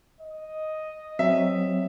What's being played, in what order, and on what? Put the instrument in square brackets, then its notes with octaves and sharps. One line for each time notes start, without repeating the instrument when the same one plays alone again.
[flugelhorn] D#5
[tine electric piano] F#3 C4 [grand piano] E5